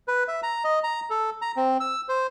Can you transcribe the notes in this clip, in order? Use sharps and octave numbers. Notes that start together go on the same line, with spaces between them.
B4
E5
A#5
D#5
A#5
A4
A#5
C4
E6
C5